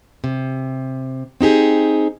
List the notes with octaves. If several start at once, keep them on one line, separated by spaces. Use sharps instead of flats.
C3
C4 D#4 G4 G#4